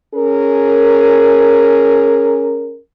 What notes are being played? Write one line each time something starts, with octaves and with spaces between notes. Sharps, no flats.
C#4 G#4 A#4